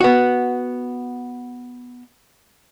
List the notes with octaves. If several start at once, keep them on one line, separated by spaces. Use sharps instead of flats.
B3 F#4